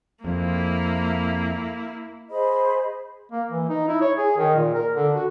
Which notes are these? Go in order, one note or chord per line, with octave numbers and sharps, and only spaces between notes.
F2 A#3 E4
G#4 C5 D#5 B5
A#3
E3
D#4
E4
C#5
G#4
D#3
A#2
A#4
D3
F#4